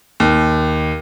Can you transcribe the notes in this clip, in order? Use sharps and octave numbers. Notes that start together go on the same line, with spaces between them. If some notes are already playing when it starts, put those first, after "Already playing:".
D#2